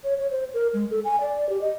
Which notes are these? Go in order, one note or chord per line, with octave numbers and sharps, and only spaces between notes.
C#5
C#5
C5
A#4
G#3
A4
G#5
D5
G4
D#5